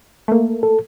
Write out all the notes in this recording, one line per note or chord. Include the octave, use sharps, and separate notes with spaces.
A3 A#3
A4